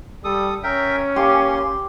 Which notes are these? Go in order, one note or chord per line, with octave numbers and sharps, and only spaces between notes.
G3 A4 D#6
C#4 A#4 E5 G5
A#3 G4 C6